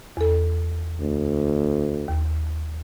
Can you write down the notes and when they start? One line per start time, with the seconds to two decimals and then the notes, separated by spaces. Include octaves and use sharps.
0.17 E2 A4
1.00 D2
2.08 D#2